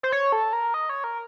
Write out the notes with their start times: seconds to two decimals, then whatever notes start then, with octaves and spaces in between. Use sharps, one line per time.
0.03 C5
0.12 C#5
0.32 A4
0.53 A#4
0.74 D#5
0.89 C#5
1.04 A#4